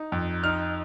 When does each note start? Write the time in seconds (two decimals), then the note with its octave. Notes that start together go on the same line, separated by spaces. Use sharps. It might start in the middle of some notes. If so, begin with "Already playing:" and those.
Already playing: D#4
0.12 F2
0.44 D#4 F6